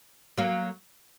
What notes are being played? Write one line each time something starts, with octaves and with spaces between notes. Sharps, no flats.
F#3 A#3